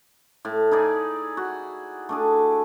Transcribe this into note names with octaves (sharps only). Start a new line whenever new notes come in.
A2
D#4 E4 G#4 D5
F#4
A3 D4 G#4